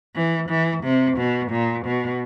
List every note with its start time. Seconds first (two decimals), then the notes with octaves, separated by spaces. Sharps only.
0.15 E3
0.49 E3
0.84 C3
1.18 B2
1.51 A#2
1.86 B2